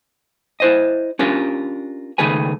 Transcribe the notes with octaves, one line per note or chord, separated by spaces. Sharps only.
E4 C5 D#5
C#4 D4 F4 G4 A#4
C#2 D#3 A3 G#4 B4 G#5